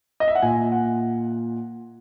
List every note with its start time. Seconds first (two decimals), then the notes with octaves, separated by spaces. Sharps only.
0.20 D#5
0.28 E5
0.35 F#5
0.42 A#2 G#5
0.72 F#5